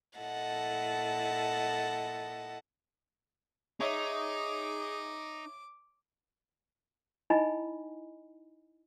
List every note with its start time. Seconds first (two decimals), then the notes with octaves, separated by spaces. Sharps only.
0.18 A#2 E4 A4 D#5 F#5 A5
3.81 D#4 G#4 C#5 E5 D6
7.30 D#4 E4 D#5 G#5 A#5 B5